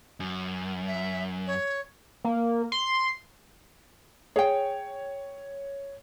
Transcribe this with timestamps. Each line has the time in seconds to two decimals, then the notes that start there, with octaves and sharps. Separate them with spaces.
0.20 F#2
0.87 E5
1.47 C#5
2.25 A#3
2.72 C6
4.36 G#4 C#5 G5